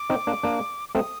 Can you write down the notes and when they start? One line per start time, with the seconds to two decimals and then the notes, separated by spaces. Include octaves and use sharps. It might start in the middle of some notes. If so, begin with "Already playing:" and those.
Already playing: D6
0.10 C4 D#4
0.27 A#3 D4
0.43 A#3 D4
0.89 D6
0.95 A3 C4 D#6